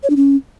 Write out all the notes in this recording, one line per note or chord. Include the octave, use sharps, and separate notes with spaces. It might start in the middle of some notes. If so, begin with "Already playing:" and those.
C#5
D4
C#4